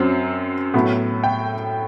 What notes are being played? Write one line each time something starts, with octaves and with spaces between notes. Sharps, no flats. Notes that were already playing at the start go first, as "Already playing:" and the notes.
Already playing: F#2 F#3 C4
A2 F#3 B3
G5